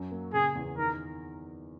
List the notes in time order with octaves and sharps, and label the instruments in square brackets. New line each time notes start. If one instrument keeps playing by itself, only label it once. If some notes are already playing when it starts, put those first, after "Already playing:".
Already playing: [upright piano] F#2 F#3
A#3
[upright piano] C#3 [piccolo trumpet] G#4
[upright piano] E2
[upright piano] D#3 [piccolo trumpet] A#4